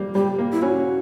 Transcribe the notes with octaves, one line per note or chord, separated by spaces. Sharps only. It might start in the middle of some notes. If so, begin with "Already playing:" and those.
Already playing: G3 A#3
G3 G4
A#3
E4
C#4 F#4